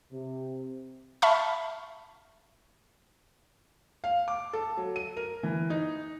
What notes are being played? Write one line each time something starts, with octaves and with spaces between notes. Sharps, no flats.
C3
E5 A5 B5 C#6 F6
F5
D6
A4
F#3
D#7
A#4
E3
D#4